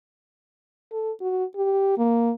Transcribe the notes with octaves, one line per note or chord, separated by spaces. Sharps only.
A4
F#4
G4
A#3